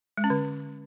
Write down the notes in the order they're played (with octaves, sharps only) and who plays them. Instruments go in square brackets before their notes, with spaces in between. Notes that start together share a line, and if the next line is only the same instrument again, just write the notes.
[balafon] G#3
C#4
D3